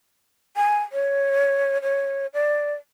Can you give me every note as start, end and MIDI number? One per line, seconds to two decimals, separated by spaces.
0.57 0.80 80
0.92 1.81 73
1.82 2.27 73
2.34 2.74 74